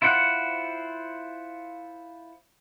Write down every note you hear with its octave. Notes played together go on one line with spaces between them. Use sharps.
E4 F4 C5 F#5